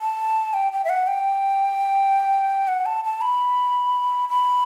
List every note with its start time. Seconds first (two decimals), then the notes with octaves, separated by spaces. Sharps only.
0.01 A5
0.54 G5
0.72 G5
0.85 E5
0.89 F#5
1.07 G5
2.68 F#5
2.86 A5
3.05 A5
3.21 B5
4.29 B5